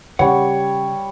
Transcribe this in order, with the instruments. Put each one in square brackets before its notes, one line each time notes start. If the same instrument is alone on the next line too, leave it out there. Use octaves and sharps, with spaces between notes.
[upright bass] C#3 [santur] G3 C#5 [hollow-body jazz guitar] F#5